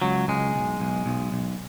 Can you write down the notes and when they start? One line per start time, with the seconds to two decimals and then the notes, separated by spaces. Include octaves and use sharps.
0.02 C#2 F#3
0.28 C#2 G#3
0.54 B1
0.80 B1
1.06 B1
1.32 B1